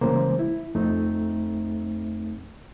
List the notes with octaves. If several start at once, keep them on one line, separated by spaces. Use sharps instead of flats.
C#3 E3 G3 G#3 A#3 C5
E4
F2 A3 C4 D#4